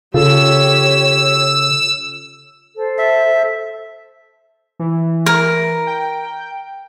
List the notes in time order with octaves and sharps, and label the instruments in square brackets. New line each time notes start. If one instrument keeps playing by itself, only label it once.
[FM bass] C#3 [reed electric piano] F4 A4 [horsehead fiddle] G4 C#5 [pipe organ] E6
[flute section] A4 C5
[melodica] E5
[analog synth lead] E3
[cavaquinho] A#4
[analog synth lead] G5